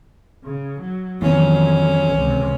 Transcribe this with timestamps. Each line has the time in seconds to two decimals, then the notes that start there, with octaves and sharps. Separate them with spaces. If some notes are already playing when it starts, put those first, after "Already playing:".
0.44 C#3
0.80 F#3
1.22 F2 D#3 E3 F#3 B3 C#4
2.15 C#2 C3